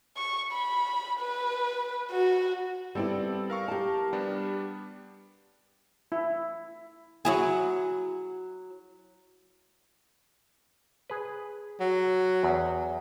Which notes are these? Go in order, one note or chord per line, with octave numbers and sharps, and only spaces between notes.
C#6
B5
B4
F#4
G3 B3 C4 E4 A4 D5
A#4 F5 C#6
G4 A5
G3 B3 D4
E4
F#3 E4 G#4
G#4 B4
F#3
E2